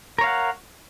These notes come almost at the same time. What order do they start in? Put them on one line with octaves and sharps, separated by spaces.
A#4 C#5 F5 F#5